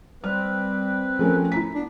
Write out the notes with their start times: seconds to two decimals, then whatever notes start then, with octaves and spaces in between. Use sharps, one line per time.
0.24 G3 C4 B4 F6
1.19 F3 A3 C#4 A#4
1.52 E4 A#5 B6
1.75 B3 D4